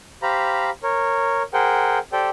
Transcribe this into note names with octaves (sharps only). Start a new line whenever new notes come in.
G4 C5 F5 A#5 B5
A#4 C#5
G#4 A#4 C5 F#5 G5
G4 A4 C5 D5 G5